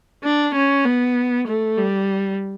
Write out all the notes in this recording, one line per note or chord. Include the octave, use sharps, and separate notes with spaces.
D4
C#4
B3
A3
G3